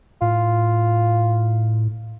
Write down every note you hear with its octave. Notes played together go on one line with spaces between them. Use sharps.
A2 F4